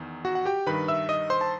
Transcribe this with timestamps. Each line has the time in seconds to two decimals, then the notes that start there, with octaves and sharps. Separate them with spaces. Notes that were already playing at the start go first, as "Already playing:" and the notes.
Already playing: E2 D#3
0.25 F#4 F#5
0.35 F#5
0.45 G4 G5
0.67 G2 D#3 B4 B5
0.88 E5 E6
1.09 D#5 D#6
1.30 C5 C6
1.41 A5